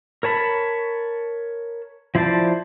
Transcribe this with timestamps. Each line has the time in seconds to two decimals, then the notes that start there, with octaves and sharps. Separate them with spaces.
0.23 A#4 C#5 A5 B5
2.15 F3 E4 C5 D5 A5